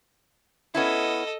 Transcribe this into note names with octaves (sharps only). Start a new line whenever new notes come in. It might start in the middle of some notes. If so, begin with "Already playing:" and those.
B3 C#4 E4 A4 D#5